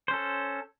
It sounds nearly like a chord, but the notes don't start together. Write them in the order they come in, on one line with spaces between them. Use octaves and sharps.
C5 C#4 A4